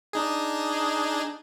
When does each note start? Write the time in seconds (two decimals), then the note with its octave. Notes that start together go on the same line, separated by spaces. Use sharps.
0.13 D4 D#4 G#4